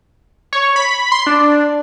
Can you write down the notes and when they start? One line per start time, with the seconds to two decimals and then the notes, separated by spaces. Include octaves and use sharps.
0.53 C#5
0.76 B5
1.12 C6
1.27 D4